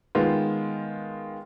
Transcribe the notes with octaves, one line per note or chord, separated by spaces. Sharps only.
D#3 G#3 B3 F4